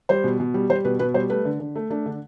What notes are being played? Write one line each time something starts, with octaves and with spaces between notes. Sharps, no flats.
G3 C5
B2
B2
G3
G3 C5
B2 B4
B2 B4
G3 C5
A3 B4
D3
D3
A3
A3 D4
D3